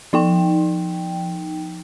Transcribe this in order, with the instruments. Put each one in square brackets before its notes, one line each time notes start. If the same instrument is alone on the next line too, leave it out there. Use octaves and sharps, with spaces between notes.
[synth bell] F3 D#4 G5